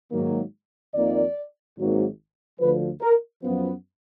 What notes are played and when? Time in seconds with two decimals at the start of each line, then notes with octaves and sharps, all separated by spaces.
0.12 G#2 D#3 F#3 A#3
0.94 F2 D#3 A#3 D5
1.77 G#1 G#2 F#3 A#3
2.60 D2 D3 F3 B4
3.01 A#4
3.43 F#2 F3 B3